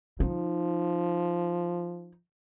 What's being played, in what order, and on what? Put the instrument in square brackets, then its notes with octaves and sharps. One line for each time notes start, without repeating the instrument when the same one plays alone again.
[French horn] F3 [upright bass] D#4